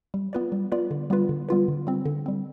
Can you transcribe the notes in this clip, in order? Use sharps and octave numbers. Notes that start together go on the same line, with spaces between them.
G3
B3 F4 B4 D5
G3
B3 F4 B4 D5
D3
G3 B3 F4 B4
D3
G3 B3 F4 B4
D3
G3 C4
D3
G3 C4